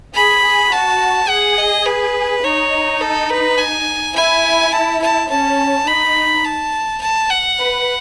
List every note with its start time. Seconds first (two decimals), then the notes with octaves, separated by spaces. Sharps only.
0.14 G#4 B5
0.44 G#4
0.72 F#4 A5
1.29 G#4 F#5
1.58 D#5
1.86 B4
2.44 D#4 C#5
3.01 A4
3.30 B4
3.58 G#5
4.15 E4 G#5
4.73 A5
5.02 A5
5.30 C#4 A5
5.87 D#4 B5
6.45 A5
7.01 A5
7.30 F#5
7.59 B4